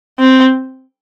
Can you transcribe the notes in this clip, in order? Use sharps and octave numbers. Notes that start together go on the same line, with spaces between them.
C4